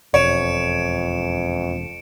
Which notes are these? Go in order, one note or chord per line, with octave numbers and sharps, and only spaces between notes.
E1 F2 C#5 C#7 D7 E7